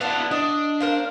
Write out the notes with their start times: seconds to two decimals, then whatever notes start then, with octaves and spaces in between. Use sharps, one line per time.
0.01 B3 D4 E4 A4 F5
0.31 D4 D#5
0.80 A#4 C5 F5